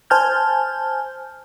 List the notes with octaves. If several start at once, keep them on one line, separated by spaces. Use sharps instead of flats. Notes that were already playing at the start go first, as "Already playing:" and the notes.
C5 G#5 A5 F6 G6